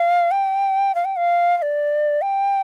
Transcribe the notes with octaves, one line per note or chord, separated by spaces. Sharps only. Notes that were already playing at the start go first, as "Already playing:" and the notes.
Already playing: F5
G5
F5
G5
F5
F5
D5
G5